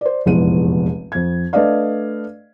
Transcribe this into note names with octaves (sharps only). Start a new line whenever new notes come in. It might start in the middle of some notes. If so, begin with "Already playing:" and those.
C5 D5
F1 A#1 E2 G#3 B3 D#7
F2 G#6
A3 D4 B4 D5 D#5 F5